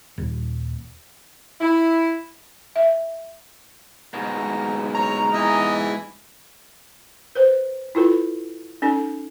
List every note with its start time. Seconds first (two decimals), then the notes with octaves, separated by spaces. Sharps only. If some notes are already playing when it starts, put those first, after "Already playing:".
0.18 D#1
1.61 E4
2.76 E5
4.14 G#2 B2 A#5
4.94 C#5 A#5
5.33 E3 D#5 G#5
7.35 B4 C5
7.95 E4 F4 A4 B4
8.82 C#4 D#4 A4